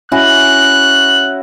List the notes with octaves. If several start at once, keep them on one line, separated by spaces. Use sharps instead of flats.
C#4 E4 F#4 F#6